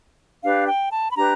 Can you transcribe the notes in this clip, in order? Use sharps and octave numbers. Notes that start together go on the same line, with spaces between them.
D4 G4 B4 F5
G5
A5
B5
D4 G4 B4 A#5